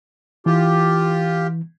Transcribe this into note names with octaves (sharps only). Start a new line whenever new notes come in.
E3 F4 G4